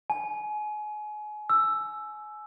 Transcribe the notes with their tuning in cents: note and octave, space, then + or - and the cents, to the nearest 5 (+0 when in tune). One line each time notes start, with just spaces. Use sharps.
G#5 +30
E6 +5